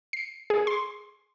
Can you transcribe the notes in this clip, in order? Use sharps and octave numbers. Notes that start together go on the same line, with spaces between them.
C7
G#4
C6